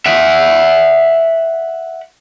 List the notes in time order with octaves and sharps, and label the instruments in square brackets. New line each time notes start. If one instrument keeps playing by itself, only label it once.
[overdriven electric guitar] E5 F#5